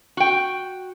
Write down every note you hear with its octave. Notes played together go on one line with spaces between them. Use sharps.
F#4 G5